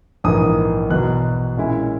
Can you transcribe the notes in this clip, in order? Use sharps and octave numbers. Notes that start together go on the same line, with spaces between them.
A#1 G#2 E3 A#3 D#6
E2 B2 F#3 F#6
A#2 G#3 C#4 E4